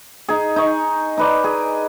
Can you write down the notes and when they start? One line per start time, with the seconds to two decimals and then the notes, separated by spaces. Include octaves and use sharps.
0.29 D#4 G#4
0.56 D#4 C#6
1.17 D#4 B4 D5
1.44 G#4